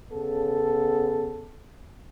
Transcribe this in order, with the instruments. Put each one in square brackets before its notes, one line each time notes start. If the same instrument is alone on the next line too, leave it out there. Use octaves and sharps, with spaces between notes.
[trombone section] C#3 B3 A4